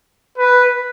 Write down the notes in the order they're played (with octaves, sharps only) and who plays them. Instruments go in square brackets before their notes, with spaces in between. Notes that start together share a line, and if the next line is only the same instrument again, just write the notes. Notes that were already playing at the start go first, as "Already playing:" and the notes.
[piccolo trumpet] B4